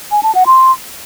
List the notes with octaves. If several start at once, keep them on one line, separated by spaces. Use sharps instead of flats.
G#5
A5
F#5
C6